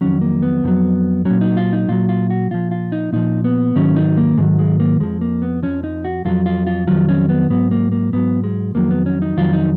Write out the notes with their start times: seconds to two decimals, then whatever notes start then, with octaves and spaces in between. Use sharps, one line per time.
0.01 F2 D#3 F#3 C#4
0.21 A#3
0.42 B3
0.64 F2 D#3 F#3
1.25 A#2 F#3 C#4
1.41 D#4
1.57 F4
1.73 D#4
1.88 A#2 F#3 F4
2.09 F4
2.30 F#4
2.51 A#2 F3 F4
2.71 F4
2.92 D#4
3.13 A#2 F3 D#4
3.44 B3
3.76 G#2 D#3 F#3 C#4
3.96 D#4
4.17 A#3
4.37 G#2 D#3 F#3 G#3
4.59 G#3
4.80 A#3
5.00 F2 F3 G#3
5.21 A#3
5.42 B3
5.63 F2 F3 C#4
5.84 D#4
6.04 F#4
6.25 F2 D#3 F#3 F4
6.46 F4
6.67 F4
6.87 F2 D#3 F#3 F4
7.09 C#4
7.29 B3
7.50 G#2 F#3 B3
7.71 A#3
7.92 A#3
8.13 G#2 F#3 B3
8.44 G#3
8.75 F2 D#3 F#3 A#3
8.91 B3
9.06 C#4
9.22 D#4
9.37 F2 D#3 F#3 F4
9.53 D#4